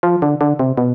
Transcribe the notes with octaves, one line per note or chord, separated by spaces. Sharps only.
F3
D3
D3
C3
B2